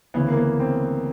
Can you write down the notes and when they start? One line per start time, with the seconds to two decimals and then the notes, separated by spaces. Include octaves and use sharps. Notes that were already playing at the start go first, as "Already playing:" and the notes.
0.14 D2 C#3 E3 B3
0.29 A#3
0.37 B3
0.60 C4